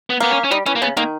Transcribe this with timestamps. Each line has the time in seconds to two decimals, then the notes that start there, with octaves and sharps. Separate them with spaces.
0.10 B3
0.20 A#3 B3
0.30 C#4
0.44 C#4
0.51 G3 D#4
0.66 E3 C#4
0.76 A#3
0.82 C#3 B3
0.97 D#3 A#3